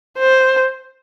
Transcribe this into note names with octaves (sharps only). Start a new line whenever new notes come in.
C5